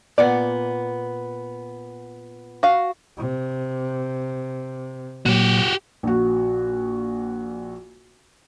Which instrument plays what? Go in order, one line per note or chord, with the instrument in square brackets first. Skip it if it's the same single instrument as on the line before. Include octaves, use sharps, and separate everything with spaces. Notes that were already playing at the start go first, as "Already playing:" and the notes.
[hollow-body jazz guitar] A#2 B3 F#5 [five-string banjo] D5
[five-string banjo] F#4 F5
[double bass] C3
[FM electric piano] A#2 F#3 [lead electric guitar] F#4 G4
[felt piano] A#1 F#4